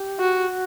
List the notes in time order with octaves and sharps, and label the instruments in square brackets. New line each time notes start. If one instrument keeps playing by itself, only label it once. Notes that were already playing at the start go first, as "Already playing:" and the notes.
Already playing: [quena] G4
[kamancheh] F#4
[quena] F#4